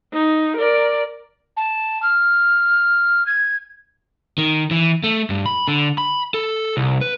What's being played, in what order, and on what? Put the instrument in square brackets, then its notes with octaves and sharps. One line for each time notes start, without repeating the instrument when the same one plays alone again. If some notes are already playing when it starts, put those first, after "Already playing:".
[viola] D#4
A#4 D5
[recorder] A5
F6
G#6
[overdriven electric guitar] D#3
E3
A3
G2
B5
D3
B5
A4
C2
B4